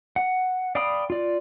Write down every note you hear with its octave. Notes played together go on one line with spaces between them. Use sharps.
F#5
D5 F5 G5 B5 D#6
F4 D5